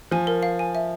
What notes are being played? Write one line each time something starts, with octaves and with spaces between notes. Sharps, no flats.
F3 G#5
A#4
F5
G#5
E5